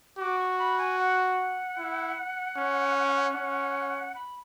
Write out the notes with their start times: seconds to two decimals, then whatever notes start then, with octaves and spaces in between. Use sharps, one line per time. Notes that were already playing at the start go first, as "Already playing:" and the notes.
0.19 F#4 D6
0.39 C#6
0.59 B5
0.78 G#5
0.99 F#5
1.78 E4
2.57 C#4
3.35 C#4
4.15 B5